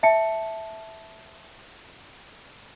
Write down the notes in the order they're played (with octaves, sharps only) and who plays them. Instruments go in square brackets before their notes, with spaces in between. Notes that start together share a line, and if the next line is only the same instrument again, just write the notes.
[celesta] E5 A5 C#7